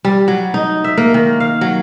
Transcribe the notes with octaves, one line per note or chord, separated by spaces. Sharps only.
G3
F#3
D#4
E5
A#3
D#3
F5
F#3